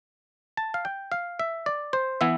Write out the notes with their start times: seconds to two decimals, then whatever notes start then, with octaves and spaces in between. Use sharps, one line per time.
0.57 A5
0.74 F5
0.85 G5
1.12 F5
1.39 E5
1.66 D5
1.93 C5
2.21 E3 B3 E4 E5